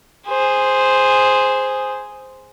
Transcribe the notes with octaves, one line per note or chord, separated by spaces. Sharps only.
G#4 C5